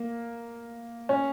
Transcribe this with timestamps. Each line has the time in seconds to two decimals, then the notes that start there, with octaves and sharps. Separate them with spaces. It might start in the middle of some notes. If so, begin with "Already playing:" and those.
Already playing: A#3
1.09 C#4